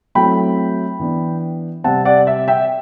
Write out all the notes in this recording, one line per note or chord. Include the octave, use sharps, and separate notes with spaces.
F#3 A3 C4 E4 G5 B5
E3 B3 D4
C3 G3 C4 F#5 A5
D5 F#5
E5
E5 G5